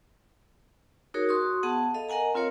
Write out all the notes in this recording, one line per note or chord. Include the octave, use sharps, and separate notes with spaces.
D#4 F#4 G#4 A#4 C#5
F#4 C6 C#6 D#6
B3 G#4 F#5 A5
A4 D#5 F5
A#4 D#5 F#5 G#5 A#5
C4 F4 A#4 C#5 F5